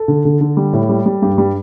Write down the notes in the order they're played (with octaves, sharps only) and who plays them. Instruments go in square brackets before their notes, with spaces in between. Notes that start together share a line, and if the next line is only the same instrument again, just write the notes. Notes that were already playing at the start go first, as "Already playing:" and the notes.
Already playing: [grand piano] A4
D3
D3
D3
G3
A2
G3
G3
G2 G4
G3